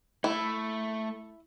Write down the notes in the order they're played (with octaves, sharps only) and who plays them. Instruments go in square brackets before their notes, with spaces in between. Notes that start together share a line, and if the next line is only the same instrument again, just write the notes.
[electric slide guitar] A3 [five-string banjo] E4